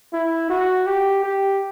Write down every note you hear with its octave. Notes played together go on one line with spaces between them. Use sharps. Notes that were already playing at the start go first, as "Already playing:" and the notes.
E4
F#4
G4
G4